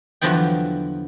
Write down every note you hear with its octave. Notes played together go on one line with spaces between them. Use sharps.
E2 D3 F3 F#3 B3 G5